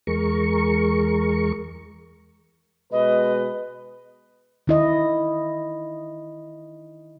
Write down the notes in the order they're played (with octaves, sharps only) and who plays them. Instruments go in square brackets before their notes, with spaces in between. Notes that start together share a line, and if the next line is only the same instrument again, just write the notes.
[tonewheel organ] E2 G#3 A#4 C#6
[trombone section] B2 G#3 B4 [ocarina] D#5
[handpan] D#3 E4 D#5